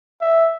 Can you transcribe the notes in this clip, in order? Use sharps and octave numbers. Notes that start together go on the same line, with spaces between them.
E5